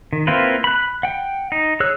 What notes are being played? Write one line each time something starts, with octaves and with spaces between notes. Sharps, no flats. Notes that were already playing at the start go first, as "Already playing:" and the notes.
D#3
A#3 C4 E4 F4 B4
B5 F#6
F#5 G5
D#4
G#4 C#5 E6 F#6